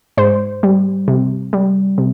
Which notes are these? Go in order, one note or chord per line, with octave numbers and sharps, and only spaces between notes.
G#2 C5
G3
C3
G3
C3